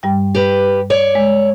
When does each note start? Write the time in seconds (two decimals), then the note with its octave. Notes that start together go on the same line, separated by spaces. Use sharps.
0.03 G2 G3 G5
0.35 G4 B4
0.90 C#5 D5
1.15 G#3